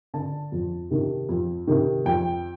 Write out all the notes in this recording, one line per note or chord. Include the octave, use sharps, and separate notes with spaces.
D3 A5
F2
C3 D#3
F2
C3 D#3
F2 G5